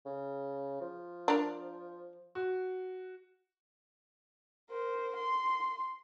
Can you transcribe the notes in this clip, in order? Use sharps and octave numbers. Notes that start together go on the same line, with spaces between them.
C#3
F3
D4 A#4
F#4
A#4 C5
C6